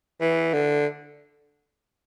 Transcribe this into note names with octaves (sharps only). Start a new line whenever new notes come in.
E3
D3